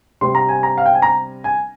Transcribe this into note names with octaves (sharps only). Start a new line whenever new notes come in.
C3 G3 C4 C6
A#5
G#5
A#5
F5
G5
G#5
A#5
G#5